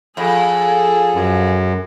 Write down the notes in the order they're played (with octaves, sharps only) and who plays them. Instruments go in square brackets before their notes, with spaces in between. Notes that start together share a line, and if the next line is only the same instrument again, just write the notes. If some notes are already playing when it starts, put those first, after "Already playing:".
[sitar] F2 [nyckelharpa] G#4 A4
[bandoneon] F#2